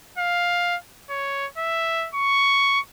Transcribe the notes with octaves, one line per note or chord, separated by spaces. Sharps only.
F5
C#5
E5
C#6